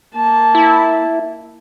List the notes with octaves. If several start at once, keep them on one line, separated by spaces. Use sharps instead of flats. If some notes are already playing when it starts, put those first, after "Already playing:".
A#3 A5
E4